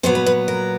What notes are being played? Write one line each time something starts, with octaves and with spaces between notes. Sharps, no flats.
A#2 F#3 B3 C5
B4
B4
A#4